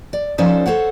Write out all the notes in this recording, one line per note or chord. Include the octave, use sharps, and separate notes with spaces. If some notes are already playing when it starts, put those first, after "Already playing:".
D5
F3 C#4 D#4 A4 C5 D5
A4 C5 C#5 F#5